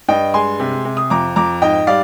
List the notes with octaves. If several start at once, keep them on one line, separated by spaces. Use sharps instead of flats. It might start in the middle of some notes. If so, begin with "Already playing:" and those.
G2 D#5 G5
G#3 G#5 C6
C3
C3
D#6
F2 A#5 D6
F2 A#5 D6
G#2 D#5 G5
G3 D5 F5